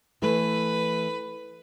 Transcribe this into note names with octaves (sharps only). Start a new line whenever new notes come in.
E3 A3 B4